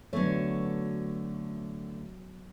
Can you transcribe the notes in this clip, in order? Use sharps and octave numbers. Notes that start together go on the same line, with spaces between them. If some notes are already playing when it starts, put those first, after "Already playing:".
D3 F#3 A3 B3 C#5